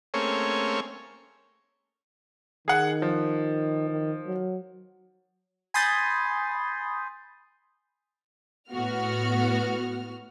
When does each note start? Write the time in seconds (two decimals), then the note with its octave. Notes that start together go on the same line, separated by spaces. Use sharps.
0.14 A3 A#3 C4 C#4 G#4 C#5
2.68 D#3 G#4 F#5
3.02 F3
3.89 D#3
4.26 F#3
5.74 G#5 B5 C6 D#6 G6 A6
8.71 A2 B3 F#4 F6